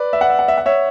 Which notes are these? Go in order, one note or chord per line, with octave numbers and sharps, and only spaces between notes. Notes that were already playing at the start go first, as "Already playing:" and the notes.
Already playing: B4 D5
E5
F#5
E5
F#5
E5
F#5
C#5 E5